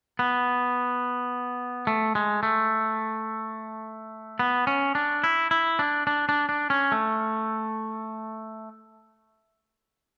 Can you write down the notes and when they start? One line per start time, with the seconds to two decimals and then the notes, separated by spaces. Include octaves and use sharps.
0.19 B3
1.87 A3
2.15 G#3
2.43 A3
4.39 B3
4.67 C#4
4.95 D4
5.24 E4
5.51 E4
5.79 D4
6.07 D4
6.29 D4
6.49 D4
6.70 C#4
6.92 A3